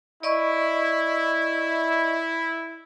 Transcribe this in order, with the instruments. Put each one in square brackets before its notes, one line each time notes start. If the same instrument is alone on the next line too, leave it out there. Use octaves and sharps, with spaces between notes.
[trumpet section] E4 [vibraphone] D5 D#5 C#6